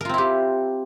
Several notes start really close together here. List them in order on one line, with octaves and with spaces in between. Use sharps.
A#4 F4 C4 E4 G4